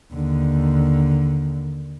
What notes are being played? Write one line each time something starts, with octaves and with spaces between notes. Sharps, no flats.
D#2 D3